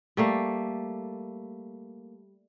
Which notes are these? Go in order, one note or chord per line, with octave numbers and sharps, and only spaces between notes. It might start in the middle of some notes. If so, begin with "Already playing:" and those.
G3 A3 A#3